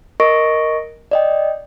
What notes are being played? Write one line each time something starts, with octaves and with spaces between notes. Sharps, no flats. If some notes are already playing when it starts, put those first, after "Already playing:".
A#4 D#5 C#6 A#6 D7
D5 D#5 G5